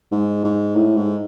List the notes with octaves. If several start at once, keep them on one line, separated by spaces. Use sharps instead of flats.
G#2
G#2
A2
G#2